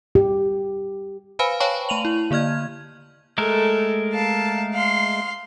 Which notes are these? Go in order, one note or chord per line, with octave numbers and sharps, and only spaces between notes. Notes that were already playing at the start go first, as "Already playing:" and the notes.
G4
B4 C5 F5 G#5 B5
C#5 F5 G5 A5 B5 C#6
A3 D#7 F7 F#7
E4
D3 A#3 D5 F6 G#6
G#3 A3 A4 A#4
F5 A5
F5 C6